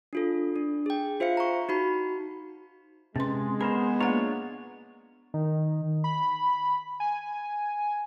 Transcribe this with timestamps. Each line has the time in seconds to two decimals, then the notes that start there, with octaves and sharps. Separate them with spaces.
0.13 D4 F4 A4
0.56 D4
0.86 G#4 G5
1.20 F4 C5 E5 F5 C#7
1.37 A#5 C#6
1.69 D#4 F#4 B5
3.16 C3 G#3 C#4 B4 C6
3.61 B3 G#4 A#4 C5 B5
4.00 A#3 D4 F4 C#5 F#5 A#5
5.34 D#3
6.04 B5
7.00 G#5